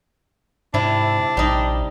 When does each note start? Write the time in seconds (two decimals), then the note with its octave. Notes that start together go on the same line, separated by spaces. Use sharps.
0.74 G#2 C3 D4 E4
1.37 A#1 G3 D#4